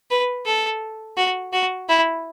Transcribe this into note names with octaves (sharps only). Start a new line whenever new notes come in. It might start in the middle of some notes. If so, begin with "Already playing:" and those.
B4
A4
F#4
F#4
E4